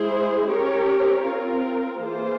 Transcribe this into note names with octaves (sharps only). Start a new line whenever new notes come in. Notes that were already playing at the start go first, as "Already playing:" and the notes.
Already playing: G#3 E4 G#4 C5
C#4 G4 A#4 C#5
C4 F4 A#4
E3 A#3 F4 G#4 C5